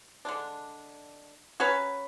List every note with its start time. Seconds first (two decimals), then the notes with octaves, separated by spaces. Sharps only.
0.25 D3 G#3 D4
1.60 F#3 C#4 F#4 B4